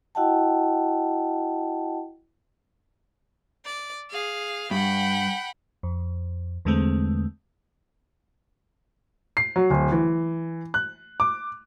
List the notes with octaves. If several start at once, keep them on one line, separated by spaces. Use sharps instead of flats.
E4 F#4 D#5 F#5 G5 A5
D5
G#4 F5
G2 F#5 G5 B5
F2
E2 D3 G#3 A3 C4
C7
F#3
D1
E3
F#6
D6